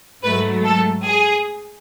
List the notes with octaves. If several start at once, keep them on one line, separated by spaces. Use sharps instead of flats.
G#2 F#3 A3 B4
A4
G#4